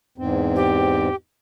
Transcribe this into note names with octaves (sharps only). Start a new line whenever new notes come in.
E2 G#2 C4
G4